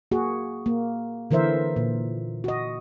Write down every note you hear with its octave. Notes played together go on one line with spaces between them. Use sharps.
A#3 F#4 G#4
A#3
D3 E3 A#4 C5 E5
A#2
F#4 D#5